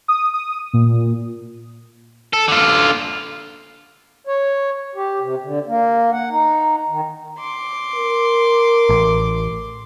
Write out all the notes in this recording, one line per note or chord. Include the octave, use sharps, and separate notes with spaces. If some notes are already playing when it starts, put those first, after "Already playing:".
D#6
D#6
A#2
A4
D3 F4
C#5
G4
C3
D3
A#3
F#5
D#4
D#3
C6 D6
A#4
A1